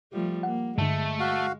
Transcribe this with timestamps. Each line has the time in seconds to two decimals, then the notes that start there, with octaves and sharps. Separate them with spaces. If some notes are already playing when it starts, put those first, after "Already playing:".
0.12 F3 G3 A3
0.43 A#3 F#5
0.78 G2 D3 G#3 A3
1.20 F#4 F5